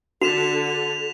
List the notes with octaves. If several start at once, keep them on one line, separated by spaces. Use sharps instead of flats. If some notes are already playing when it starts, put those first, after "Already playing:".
D3 F#4 A4 B6 E7 F7